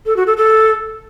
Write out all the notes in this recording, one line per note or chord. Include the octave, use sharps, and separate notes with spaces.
A4
F#4
A4
A4